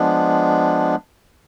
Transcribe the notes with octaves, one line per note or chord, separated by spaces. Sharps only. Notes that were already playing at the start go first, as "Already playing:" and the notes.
Already playing: F3 G#3 B3 D4